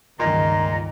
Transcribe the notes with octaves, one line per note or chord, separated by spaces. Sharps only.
C#2 G2 A#2 D#3 D#5 A#5